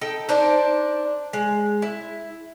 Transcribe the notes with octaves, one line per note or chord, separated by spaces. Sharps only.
D#4 A4 G5
D4 D#4 C5 D5
G#3
E4